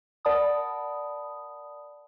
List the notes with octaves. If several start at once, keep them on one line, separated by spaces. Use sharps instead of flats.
A#4 D5 F#5 A5 B5 D#6